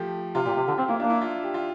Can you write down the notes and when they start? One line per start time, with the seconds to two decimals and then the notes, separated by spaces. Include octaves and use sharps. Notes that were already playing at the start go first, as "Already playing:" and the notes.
Already playing: F3 A3 G4
0.35 C3 F4
0.45 A#2 G4
0.56 C3 G4
0.67 D3 G4
0.78 C4 F4
0.88 A#3 E4
1.00 A#3 D4
1.10 E4
1.21 F4
1.43 G4
1.54 F4